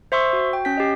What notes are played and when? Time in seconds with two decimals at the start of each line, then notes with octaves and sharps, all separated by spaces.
0.12 C5 E5 C6 C#6 E6
0.33 F#4
0.53 G5
0.65 C#4 G6 B6
0.77 G4 D#5